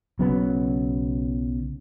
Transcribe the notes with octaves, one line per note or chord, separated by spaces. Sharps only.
B1 C#3 F#3 B3